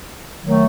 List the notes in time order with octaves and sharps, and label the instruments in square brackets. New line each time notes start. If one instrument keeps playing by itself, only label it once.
[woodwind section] D#3 F#3 A3